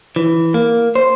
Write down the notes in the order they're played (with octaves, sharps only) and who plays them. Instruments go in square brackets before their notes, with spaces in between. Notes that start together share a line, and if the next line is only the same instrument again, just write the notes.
[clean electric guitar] E3
A#3
C5